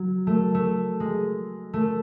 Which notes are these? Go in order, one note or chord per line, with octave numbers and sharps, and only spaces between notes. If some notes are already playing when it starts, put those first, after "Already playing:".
Already playing: F#3
A3
A3
G#3
A3